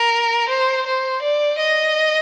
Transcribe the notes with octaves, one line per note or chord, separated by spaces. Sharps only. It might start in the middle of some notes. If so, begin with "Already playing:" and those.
Already playing: A#4
C5
C5
D5
D#5